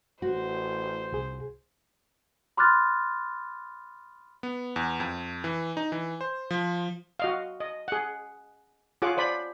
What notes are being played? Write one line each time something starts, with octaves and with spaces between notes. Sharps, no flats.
A1 F#4 C5
C2 G#4
B5 C6 D6 F6 F#6 A6
B3
E2
F2
E3
D#4
E3
C5
F3
F#4 D#5 F5
D#5
G#4 F#5
F4 G#4 C#5 F#5 D6
C5 D5 B5